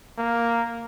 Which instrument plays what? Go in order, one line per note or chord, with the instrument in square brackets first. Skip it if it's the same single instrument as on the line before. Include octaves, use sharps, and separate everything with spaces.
[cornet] A#3